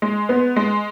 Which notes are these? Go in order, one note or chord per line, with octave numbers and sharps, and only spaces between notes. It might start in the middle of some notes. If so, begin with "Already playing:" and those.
G#3
B3
G#3